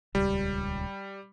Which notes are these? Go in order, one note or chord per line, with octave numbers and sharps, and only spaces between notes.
D#1 C#2 G3